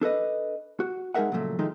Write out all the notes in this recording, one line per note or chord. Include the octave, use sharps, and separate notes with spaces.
D4 A4 B4 D#5
F#4
G#3 D#4 G#4 A#4 E5 F#5
A#2 C#3 F3 F#3 A3
D#3 F3 G#3 A3 D#4